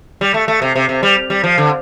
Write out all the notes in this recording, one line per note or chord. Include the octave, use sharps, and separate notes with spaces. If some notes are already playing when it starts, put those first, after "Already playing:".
G3
A3
A3
C3
C3
C3
G3
G3
F3
D3